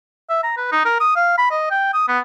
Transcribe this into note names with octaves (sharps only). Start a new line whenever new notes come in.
E5
A#5
B4
D#4
A#4
D#6
F5
B5
D#5
G5
D#6
B3